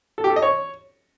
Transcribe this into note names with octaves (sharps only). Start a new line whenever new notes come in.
A4
G4
A4
D#5
C#5